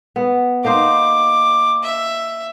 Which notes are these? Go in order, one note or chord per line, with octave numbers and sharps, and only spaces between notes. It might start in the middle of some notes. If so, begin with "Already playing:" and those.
B3
A#3 D#4 C5 D6
E5